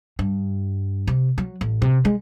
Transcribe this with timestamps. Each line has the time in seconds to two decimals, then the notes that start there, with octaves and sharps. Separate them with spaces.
0.19 G2
1.07 C3
1.38 F#3
1.61 A1
1.82 C3
2.05 G#3